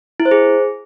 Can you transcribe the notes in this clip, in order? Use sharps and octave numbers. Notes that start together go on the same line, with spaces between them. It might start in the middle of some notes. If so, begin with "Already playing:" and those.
E4
C5
G#4